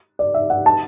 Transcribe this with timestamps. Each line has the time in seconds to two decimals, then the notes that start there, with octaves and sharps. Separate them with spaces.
0.19 D5
0.34 E5
0.50 F#5
0.66 A5